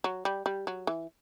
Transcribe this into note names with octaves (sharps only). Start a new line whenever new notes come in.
F#3
G3
G3
F#3
E3